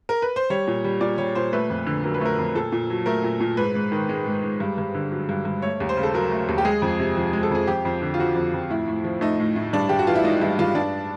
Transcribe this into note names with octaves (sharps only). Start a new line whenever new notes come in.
A#4
B4
C5
G3 C#5
A#2
G3
A#2 D5
G3 C#5
A#2 C5
A3 B4
F2
D3
F#3 A#4
B4
A3 A#4
F2
A#2 A4
A#2
F#3
A3 A#4
A#2
A#2
G#2 B4
G#2
D#3
G#3
G#2
G#2
G2
G2
D3
F#3
G2
G2
A3 C#5
D#2
C5
C#3
A4
F#3 A#4
A3
D#2
G4
G#3 G#4
F2
C3
F3
G#3
A4
F2 G#4
F2 G4
F2
D3
F4
F3 F#4
F2
F2
A2 E4
A2
F3
A3 D#4
A2
A2
G2 D4
G2 G4
F#4
E3 F4
E4
G#3 D#4
G2 E4
G2 F4
G2 D4